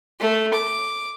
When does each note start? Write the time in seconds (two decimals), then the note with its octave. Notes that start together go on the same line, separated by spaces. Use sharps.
0.20 A3
0.54 D6